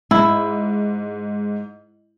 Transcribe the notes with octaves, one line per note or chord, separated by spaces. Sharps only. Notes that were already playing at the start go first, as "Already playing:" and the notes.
G#2 E4